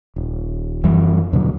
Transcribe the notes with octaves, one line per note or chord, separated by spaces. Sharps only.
D#1
F#2 E3 G3
D#2 B2 D3 F#3